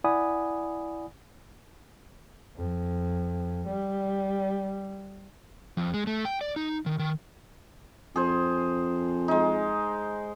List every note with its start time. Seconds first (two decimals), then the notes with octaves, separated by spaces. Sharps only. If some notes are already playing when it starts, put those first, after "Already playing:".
0.04 E4 D5 F#5 G#5 B5 D#6
2.57 F2
3.67 G3
5.77 F2
5.94 G#3
6.07 A3
6.25 G5
6.41 D5
6.56 D#4
6.86 D#3
6.99 D#3
8.16 F2 G#4 C5
9.28 G#3 D#4